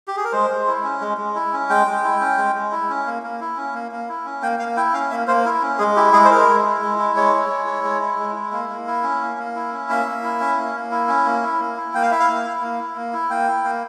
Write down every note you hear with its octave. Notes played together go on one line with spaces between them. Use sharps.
G4
G#4
A#4
G#3 C5
G#3
E4
C#4
G#3
G#3
E4
C#4
G#3 G5
G#3
E4
C#4
G#3
G#3
E4
C#4
A#3
A#3
E4
C#4
A#3
A#3
E4
C#4
A#3 G5
A#3 F5
E4 G5
C#4 F5
A#3 E5
A#3 C5
E4 A#4
C#4
G#3 G#4
E4 G4
G#3 G#4
C5
E4 A#4
G#3
E4
G#3
E4
G#3 C#5
E4
G#3
E4
G#3
E4
G#3
E4
A#3
A#3
E4
C#4
A#3
A#3
E4
C#4
A#3 E5
A#3
E4
C#4
A#3
A#3
E4
C#4
A#3
E4
A#3
E4
A#3 G5
F5
E4 E5
F5
A#3
E4
A#3
E4
A#3
E4
A#3 G5
E4
A#3